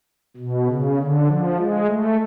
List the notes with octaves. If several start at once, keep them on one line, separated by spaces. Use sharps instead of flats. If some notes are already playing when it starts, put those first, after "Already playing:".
B2
C#3
D3
F3
G#3
A3